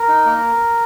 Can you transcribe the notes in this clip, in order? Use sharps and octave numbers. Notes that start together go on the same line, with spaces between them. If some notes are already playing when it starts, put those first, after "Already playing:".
Already playing: A#4
D#4
A#3